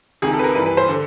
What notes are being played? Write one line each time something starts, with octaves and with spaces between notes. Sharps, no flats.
C#2 C3 D#3 G#4
A4
B4
A#4
G2 E3 B4
B4
C5
D3